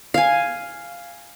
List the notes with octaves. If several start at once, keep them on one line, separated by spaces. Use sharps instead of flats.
F5 G#5